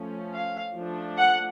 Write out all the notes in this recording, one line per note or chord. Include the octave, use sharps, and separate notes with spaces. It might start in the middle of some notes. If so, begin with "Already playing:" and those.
Already playing: F3 A3 C#4
F5
F3 A3 D4
F#5